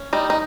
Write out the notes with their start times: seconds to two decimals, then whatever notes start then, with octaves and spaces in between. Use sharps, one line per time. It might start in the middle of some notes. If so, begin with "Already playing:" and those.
Already playing: C#4
0.13 G3 D#4
0.30 D#4